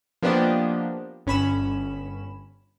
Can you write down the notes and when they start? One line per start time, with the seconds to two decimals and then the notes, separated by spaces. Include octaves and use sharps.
0.22 F3 A#3 B3 D4 G4 D#5
1.26 G1 C#4 B5 E7